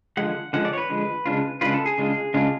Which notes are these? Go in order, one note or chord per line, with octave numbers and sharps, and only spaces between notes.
D3 F3 G#3 F#5
D3 F3 G#3 F#5
D5
C#5
B4
D3 F3 G#3
C#3 G#3 D4 F4
C#3 G#3 D4 F4 B4
A4
G#4
C#3 G#3 D4 F4
C#3 G#3 D4 F4